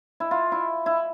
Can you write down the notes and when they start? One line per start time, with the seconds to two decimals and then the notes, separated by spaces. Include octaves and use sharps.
0.20 E4
0.31 F4
0.52 E4
0.86 E4